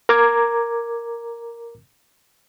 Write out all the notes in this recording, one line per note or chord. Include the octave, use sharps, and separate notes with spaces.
A#4 A#5 D6 G#6